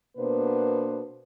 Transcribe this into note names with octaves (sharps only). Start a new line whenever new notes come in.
B2 A#3 B3 D4 B4 C5